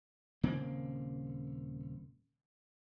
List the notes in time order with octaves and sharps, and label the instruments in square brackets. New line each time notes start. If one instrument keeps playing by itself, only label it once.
[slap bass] D#1 C#3 A#3 C4